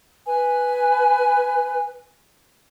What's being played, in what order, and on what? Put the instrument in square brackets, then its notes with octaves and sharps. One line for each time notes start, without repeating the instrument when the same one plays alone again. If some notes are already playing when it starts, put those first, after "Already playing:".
[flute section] B4 G#5